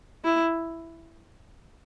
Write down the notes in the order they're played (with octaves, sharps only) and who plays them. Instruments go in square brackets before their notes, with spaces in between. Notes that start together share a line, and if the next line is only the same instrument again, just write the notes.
[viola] E4